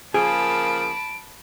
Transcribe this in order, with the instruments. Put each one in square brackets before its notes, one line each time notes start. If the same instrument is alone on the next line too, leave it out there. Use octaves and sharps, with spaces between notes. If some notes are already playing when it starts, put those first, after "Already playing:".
[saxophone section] C#3 F3 A#3 [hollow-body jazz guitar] G#4 [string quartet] A5 B5 [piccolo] D7